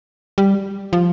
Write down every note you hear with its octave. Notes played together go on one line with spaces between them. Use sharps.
G3
F3